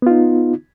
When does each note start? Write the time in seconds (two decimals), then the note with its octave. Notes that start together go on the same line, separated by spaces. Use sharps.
0.02 B3
0.07 F4
0.11 D#4